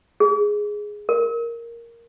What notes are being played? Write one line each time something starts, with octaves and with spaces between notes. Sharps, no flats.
G#4
A#4